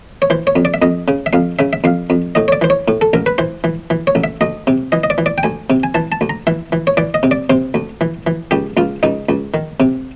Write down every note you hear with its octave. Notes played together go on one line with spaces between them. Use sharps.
C#5
E3 C5
C#5
F2
D5
E5
F2 D#5
C#3
E5
F2 F5
C#3 E5
E5
F2 F5
F2
A2 D#5
C#5
D5
E3 C5
C#5
A2
A4
A1 A#4
B4
E3 C5
E3
E3
C#5
A1
E5
D2 D#5
C3
E3 D#5
D#5
D5
E3
D5
G5
D2 G#5
C3
G#5
E3 A5
A5
D2
A#5
E3 E5
E3
C#5
E3 D5
D#5
C3
D5
C3 C5
D2
E3
E3
C#2 G4
C#2 F4
C#2 D#4
C#2
D#3
C3